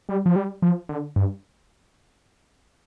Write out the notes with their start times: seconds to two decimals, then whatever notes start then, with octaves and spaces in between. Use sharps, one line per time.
0.09 G3
0.26 F3
0.36 G3
0.62 F3
0.89 D3
1.16 G2